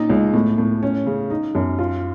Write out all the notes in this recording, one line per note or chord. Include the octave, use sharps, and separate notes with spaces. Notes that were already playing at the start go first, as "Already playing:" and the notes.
Already playing: A#2 C#4 D#4
C#2
A2
A2
C#4
C#3
D#4
F#2
F4